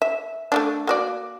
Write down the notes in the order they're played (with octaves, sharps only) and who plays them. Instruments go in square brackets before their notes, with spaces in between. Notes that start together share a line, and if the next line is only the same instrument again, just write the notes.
[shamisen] E5
A3 A#3 D4
A#3 F#4 D5